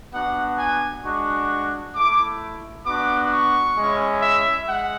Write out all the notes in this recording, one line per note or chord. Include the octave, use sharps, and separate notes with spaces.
B3 D4 F#4 F#5
G#5
G#3 D4 F#4 C#6
A3 E4 D6
B3 D4 F#4 D6
C#6
G#3 C#4 E4
E5
G#3 F#5